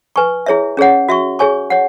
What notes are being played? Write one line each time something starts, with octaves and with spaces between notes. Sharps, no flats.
B4 G#5 C#6
E4 G#4 C#5 E5
C#4 G#4 C#5 F#5
F#4 E5 C#6
G#4 C#5 G#5 C#6
C#5 F#5